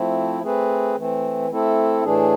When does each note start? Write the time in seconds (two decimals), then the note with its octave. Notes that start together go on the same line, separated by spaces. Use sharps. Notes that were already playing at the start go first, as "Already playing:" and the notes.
Already playing: F3 A3 C4 E4
0.43 A3 C4 G#4 B4
0.96 E3 A3 C4
1.50 A3 C4 E4 A4
2.04 A2 E3 A3 D4 G#4